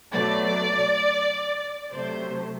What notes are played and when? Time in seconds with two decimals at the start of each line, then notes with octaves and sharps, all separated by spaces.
0.13 B2 F#3 A3 D5
1.93 C3 F#3 A3 C5